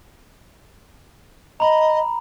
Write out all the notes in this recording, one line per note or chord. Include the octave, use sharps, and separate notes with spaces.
D#5 A#5 B5